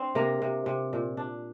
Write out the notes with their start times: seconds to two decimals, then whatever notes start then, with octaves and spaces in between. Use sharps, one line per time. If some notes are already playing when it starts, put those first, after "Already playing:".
Already playing: C4 D4 C5 D5
0.15 C3 A#3 A#4
0.42 C3
0.66 C3
0.93 A#2
1.17 D4